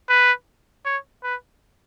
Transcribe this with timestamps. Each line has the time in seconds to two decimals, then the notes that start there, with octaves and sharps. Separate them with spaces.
0.09 B4
0.86 C#5
1.24 B4